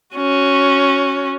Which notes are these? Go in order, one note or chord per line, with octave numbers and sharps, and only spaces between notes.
C#4 F#4